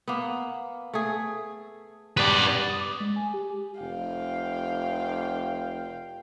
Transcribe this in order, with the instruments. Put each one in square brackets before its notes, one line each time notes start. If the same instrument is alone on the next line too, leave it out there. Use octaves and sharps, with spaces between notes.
[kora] A#3 B3
A3 G#4
[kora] G2 B3 [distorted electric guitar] B4 D5
[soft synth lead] D#6
D6
G#3
G#5
G4
[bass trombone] F1 [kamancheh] F5 G5